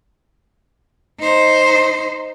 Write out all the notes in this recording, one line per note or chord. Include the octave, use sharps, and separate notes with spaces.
D#4 C5